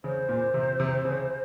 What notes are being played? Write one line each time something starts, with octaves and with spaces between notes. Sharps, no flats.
C#3 C5
A#2
C3
C3
C#3